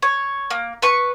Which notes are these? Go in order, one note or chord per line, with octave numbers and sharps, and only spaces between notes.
C#5
A#3
B4 C#6